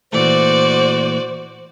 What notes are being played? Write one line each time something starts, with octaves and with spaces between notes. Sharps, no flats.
A#2 E3 A3 F#4 C5 D5